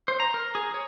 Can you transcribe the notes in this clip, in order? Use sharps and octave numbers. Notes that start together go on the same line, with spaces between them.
C5
A#5
A#4
G#4
C#5